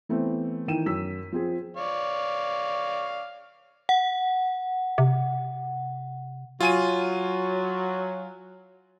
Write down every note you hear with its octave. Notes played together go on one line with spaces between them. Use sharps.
E3 A3 B3 C4
D#3 E3 E4 G5 D#7 E7
F#2 E6 B6
F3 C4 G#4
C#5 D5 F5
F#5
C3
F#3 F4 G#5 D#7